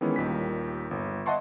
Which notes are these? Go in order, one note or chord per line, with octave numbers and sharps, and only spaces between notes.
D#3 E3 G#3 B3 C#4 E4
D#2 A#2 D#3 G3 B6
G1
D#5 E5 F#5 A5 C6 C#6